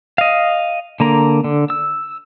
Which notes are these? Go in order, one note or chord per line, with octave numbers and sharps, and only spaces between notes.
D#5 F5
D3 A#3 A#5
D3
E6